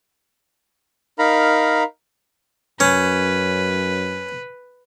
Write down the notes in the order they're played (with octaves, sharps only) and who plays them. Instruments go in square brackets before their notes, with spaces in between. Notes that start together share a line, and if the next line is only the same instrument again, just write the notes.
[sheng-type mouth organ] D#4 A#4 F5 A#5 B5
[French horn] F#2 [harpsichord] C#4 [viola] B4